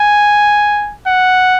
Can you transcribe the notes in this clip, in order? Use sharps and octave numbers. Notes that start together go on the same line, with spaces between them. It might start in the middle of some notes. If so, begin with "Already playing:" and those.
Already playing: G#5
F#5